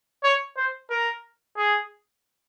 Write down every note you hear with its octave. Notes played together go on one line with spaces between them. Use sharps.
C#5
C5
A#4
G#4